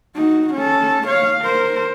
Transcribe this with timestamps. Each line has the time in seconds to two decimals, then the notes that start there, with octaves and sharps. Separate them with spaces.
0.15 D#4 F#4
0.54 C#4 A4
1.07 C#5 F5
1.41 A#4 C5